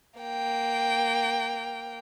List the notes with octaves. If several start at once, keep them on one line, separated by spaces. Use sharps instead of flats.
A#3 G5